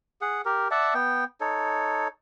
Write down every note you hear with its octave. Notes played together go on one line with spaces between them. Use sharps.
G#4 F#5
G4 A#4
D5 E5 F#5 A5
B3 G5
D#4 A4 C#5